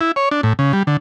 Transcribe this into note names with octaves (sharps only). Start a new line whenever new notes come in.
E4
C#5
D4
A2
C#3
G3
D3